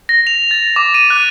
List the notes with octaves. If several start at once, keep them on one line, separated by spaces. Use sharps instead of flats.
A#6
F7
A6
D6
D#7
F#6